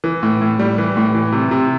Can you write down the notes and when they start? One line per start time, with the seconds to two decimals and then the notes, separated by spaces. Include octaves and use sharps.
0.04 E3
0.23 A2
0.41 A2
0.59 G3
0.78 E3
0.97 A2
1.15 E3
1.32 C3
1.51 C3